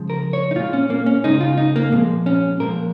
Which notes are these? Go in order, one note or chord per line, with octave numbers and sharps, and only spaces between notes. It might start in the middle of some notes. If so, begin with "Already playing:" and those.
Already playing: C#3 F3 G#3
A#4
C#5
D#4
A#2 G#3 F4
C#4
A#3
C#4
C#3 G#3 D#4
F4
D#4
A#3
A#2 F3 G#3 A#3
C#4
A#2 F3 G#3 A#4